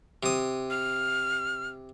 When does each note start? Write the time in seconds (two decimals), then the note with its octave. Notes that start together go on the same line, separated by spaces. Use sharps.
0.23 C3 D#6
0.70 F6